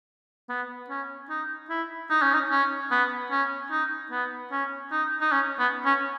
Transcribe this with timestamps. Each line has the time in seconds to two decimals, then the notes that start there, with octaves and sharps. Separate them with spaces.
0.49 B3
0.90 C#4
1.30 D#4
1.70 E4
2.10 D#4
2.22 C#4
2.34 D#4
2.51 C#4
2.91 B3
3.31 C#4
3.71 D#4
4.11 B3
4.52 C#4
4.92 D#4
5.21 D#4
5.32 C#4
5.59 B3
5.85 C#4